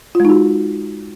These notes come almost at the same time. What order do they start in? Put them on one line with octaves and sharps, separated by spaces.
F4 G#3 D#4 F#4